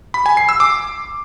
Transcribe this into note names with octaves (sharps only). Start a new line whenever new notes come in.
B5
G#5
C7
E6
D6